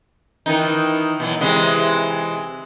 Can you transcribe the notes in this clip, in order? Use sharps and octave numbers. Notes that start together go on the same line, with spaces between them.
D#3 E3 D#4
B2 E3 F#3
C3 E3 G#3